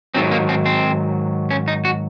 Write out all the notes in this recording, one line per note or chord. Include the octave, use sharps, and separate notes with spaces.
G#2 D#3 F#3 C4
A#3
C4
C4
C#4
D#4
F#4